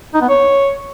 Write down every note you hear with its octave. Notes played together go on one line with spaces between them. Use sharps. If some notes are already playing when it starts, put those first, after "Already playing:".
D#4
B3
C#5